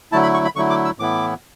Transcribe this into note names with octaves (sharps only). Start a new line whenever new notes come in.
D3 F#3 A3 E4 A5
B5
C#6
B5
D3 F#3 A3 E4 C#6
D6
E6
A2 E3 B3 E4 D6